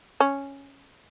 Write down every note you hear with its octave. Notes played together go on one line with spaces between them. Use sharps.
C#4